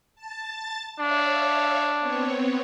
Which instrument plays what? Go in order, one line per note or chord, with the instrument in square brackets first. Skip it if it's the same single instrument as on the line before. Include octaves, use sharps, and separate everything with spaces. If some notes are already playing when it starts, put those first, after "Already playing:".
[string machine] A5 A6
[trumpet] D4 [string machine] C#5 E5 F5
[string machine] B3 C4 C#5